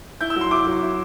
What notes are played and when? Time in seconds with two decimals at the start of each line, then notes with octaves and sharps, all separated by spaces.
0.21 E4 G6
0.30 E6
0.36 F#3
0.41 C6
0.51 E4 D6
0.67 F#3
0.82 E4